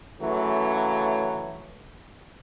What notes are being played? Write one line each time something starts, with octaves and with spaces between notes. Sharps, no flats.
C#3 E3 F#3 A3